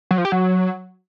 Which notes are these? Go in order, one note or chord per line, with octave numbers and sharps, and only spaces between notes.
F#3
F3
G4
F#3